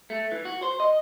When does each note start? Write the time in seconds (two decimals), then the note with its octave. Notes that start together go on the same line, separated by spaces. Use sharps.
0.10 A3
0.32 E3
0.45 F#4
0.63 C5
0.80 D#5